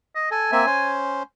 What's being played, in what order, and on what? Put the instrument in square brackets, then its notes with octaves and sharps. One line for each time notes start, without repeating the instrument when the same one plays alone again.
[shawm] D#5
[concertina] A4 [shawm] G#5
[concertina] A#3 C4 E5
C#4 C5